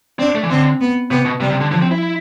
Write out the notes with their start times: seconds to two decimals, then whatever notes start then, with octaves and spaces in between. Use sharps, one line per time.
0.19 C4 D4
0.35 A3
0.43 E3
0.50 D3 C4
0.80 B3
1.11 C3 B3
1.25 B2
1.40 C3 G3
1.50 C3
1.61 D3
1.71 D3 F3
1.82 C4
1.91 E4